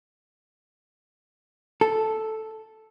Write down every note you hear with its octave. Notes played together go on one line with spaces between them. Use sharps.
A4